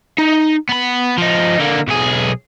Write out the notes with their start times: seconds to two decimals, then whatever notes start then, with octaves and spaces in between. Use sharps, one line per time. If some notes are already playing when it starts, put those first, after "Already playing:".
0.18 D#4
0.69 B3 B5
1.18 F3 D#4
1.59 D3 A#3
1.88 B1 G#4